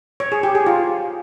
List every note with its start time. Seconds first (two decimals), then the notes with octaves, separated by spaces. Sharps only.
0.20 C#5
0.32 G#4
0.43 G4
0.55 G#4
0.67 F4